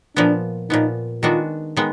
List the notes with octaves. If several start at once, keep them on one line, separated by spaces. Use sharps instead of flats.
A#2 F3 B3 D4
A#2 F3 B3 D#4
D#3 G#3 B3 D4 F4 F#4
D#3 G#3 B3